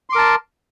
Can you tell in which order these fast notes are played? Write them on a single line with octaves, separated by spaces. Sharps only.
C6 D6 A#4 A5